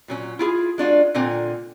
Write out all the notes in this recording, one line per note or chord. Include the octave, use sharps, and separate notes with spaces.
A#2 F#3 C#4
E4 F4 G#4
G#3 D4 F4 F#4
A#2 D3 C4 F4 G#5